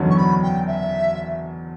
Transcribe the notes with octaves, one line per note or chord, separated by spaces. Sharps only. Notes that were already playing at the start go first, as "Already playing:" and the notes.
Already playing: F#1 E2 D3 F#3 C#4
C#6
B5
G5
E5